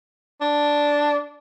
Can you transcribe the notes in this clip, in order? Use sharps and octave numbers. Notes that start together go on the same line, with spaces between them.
D4